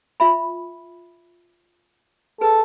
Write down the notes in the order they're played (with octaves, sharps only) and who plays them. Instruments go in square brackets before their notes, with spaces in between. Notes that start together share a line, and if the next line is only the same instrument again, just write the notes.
[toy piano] F4 E5 B5
[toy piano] G#4 B4 [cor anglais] A4